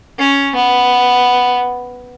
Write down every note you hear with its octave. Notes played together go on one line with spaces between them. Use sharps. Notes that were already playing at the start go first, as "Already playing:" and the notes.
C#4
B3